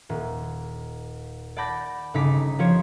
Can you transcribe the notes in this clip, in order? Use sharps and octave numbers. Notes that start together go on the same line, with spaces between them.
D#1
D5 F#5 A5 B5 G6 A#6
G1 C#3 D#4 D6 B6
F3 G4 C5 C#5